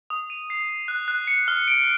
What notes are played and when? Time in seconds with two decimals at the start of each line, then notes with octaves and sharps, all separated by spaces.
0.10 D#6
0.30 D#7
0.50 C7
0.70 C7
0.88 F#6
1.08 F#6
1.27 C#7
1.48 F6
1.68 D7